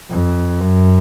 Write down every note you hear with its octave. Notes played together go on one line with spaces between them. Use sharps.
F2
F#2